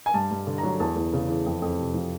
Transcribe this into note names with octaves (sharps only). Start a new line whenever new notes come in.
G#5
G2 A5
G2
D3
A#5
F#3
E2 A5
E2
C#3
E3
F2
F2
C3
F3